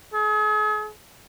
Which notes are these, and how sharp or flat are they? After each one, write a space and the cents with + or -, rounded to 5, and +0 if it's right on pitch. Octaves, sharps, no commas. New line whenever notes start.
G#4 +40